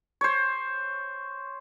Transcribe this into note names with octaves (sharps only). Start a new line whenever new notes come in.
C5 C#5